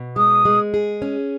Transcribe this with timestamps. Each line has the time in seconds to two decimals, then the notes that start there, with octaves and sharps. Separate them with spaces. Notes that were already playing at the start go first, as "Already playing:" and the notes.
Already playing: B2
0.16 G#3 D#6
0.45 G#3
0.74 G#4
1.02 C#4